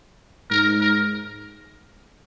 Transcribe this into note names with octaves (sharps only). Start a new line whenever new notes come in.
G#2 A#4
A#4